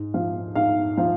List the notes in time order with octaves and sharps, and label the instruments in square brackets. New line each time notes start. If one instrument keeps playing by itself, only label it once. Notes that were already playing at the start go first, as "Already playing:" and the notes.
Already playing: [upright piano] G#2
F3 F5
G#2 F5
F3 F5